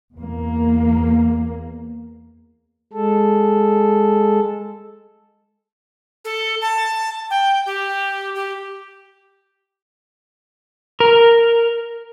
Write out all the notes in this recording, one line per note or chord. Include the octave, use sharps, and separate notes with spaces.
E2 A#3
G#3 A4
A4
A5
G5
G4
G4
A#4